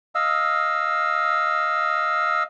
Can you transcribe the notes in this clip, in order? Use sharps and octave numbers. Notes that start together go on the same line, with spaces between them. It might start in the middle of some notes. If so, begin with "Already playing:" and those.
D#5 F5 E6